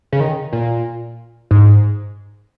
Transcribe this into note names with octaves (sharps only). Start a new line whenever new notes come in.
C#3
D#3
A#2
G#2